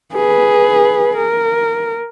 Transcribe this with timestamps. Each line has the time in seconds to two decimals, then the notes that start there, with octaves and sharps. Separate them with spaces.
0.14 G#4 B4
1.16 A#4